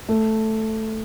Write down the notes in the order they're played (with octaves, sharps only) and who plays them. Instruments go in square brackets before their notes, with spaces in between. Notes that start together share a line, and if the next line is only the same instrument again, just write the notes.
[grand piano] A3